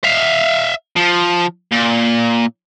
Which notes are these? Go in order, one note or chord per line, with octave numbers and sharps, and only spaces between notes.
E5 F5
F3
A#2